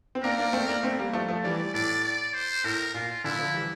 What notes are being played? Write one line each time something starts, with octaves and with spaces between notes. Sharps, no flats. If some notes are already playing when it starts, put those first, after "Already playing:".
C4
A#3 D4 A#4
A#3 D4
A3 C4
A#3 D4
A3 C4
G3 A#3
F3 A3
F3 A3
E3 G3 D5
A2 D5
D5
C5
A2 A#4
A#2 F4
A#2 D3 E4
D3 F3
E3 G3